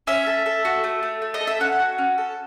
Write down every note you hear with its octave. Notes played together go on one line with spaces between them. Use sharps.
C#4 E5
A4
A4
F#4
A3
A3
A3
D#5
A4
E5
C#4 F#5
F#4
C#4
A4